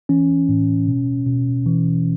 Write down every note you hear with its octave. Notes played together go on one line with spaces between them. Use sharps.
E3 C#4
A2
B2
B2
E3